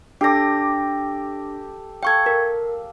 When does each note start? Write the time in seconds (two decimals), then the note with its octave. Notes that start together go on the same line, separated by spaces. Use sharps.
0.21 D4 G4 A4 D6 A#6
2.03 A4 F5 G5 C#6 G#6
2.26 A#4